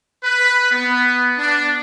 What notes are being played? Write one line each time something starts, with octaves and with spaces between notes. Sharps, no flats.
B4
B3
D4